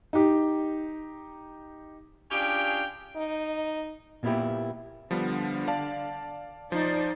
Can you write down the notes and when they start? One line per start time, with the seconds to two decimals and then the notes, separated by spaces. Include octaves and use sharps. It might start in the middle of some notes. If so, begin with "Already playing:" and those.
0.13 D#4 G4
2.30 C#4 D4 F4 G4 G#4 G5
3.16 D#4
4.23 A#2 A#3 B3 D#4 E4 G4
5.11 D3 F3 G3 B3
5.68 D5 F5 A5
6.72 F3 D#4 C5 D5